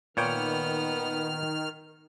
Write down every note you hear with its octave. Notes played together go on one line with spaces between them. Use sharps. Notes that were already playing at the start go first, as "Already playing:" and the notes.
A#2 D#3 B3 C#5 G5 F6